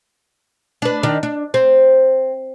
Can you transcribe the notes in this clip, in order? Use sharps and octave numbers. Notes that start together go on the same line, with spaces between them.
D4 B4
D#3 D4
D4
C4